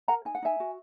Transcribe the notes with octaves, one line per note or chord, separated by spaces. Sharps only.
A#4 F#5 A#5
D#4 G#5
F#5
D#4 E5 G#5
F#4